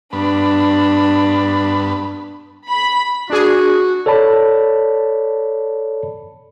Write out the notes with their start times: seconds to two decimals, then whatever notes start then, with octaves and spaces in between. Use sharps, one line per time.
0.13 G2 B3 D4 B5
2.67 B5
3.30 D4 F#4 G#4
4.06 A4 C#5 D5 A5 B5